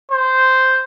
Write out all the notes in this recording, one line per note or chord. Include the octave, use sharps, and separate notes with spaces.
C5